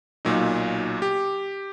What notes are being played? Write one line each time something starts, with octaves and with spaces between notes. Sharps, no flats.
B1 A#2 F#3 D#4
G4